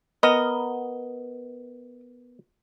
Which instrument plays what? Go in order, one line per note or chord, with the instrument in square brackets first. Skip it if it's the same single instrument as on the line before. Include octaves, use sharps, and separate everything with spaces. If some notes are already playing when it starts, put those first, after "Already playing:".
[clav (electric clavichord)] B3 A#4 [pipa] D#5